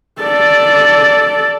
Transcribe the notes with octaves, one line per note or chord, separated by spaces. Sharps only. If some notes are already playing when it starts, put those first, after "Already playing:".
A4 D5